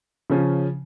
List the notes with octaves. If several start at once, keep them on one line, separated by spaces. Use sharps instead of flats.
C#3 F3 C#4